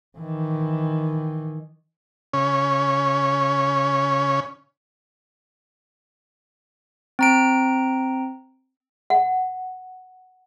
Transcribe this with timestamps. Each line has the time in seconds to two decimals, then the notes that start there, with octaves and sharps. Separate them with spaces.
0.18 D#3 E3
2.33 C#3 C#4 C#5
7.19 C4 A#5 D7
9.10 F#5